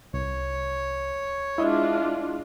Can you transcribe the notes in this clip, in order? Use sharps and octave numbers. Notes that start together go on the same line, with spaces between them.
C2 C#5
G#3 D4 E4 F4 D#5 E5